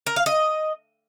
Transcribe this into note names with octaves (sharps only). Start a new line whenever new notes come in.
A#4
F5
D#5